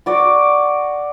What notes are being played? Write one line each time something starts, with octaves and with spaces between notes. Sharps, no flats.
F#4 D5 D6